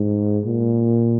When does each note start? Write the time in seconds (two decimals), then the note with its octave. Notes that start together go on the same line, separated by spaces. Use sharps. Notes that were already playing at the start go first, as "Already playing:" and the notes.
Already playing: G#2
0.45 A#2